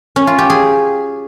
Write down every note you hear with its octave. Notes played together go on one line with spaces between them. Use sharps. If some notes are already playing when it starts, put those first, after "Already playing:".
C#4
F4
G4
G#4